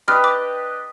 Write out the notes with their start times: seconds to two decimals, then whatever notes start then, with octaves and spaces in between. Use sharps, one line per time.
0.08 D4 G4 B4 D#5 F6
0.24 D6